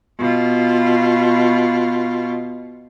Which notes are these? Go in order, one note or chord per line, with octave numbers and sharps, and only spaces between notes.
B2 F4